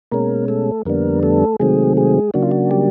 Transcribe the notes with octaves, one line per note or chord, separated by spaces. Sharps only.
B2 G#3 A#3 C#4 A#4
A3 A4
F2 D3 G3 A#3 B3 D4 A#4
A3 A4
C3 D#3 F#3 G#3 A3 C4 G#4
G#3 G#4
C#3 F#3 A#3 D4 F#4
F4
F#4
G3 G4